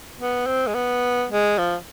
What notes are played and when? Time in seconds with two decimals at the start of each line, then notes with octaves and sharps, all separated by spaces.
0.19 B3
0.47 C4
0.67 G#3
0.75 B3
1.30 G#3
1.58 F3